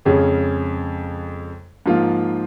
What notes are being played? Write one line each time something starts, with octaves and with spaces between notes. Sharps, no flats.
F2 C#3 G#3 C#4 G#4
G#2 F3 A#3 F4